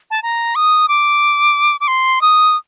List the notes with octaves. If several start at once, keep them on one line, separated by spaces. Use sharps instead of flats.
A5
A#5
D#6
D6
D6
C6
D#6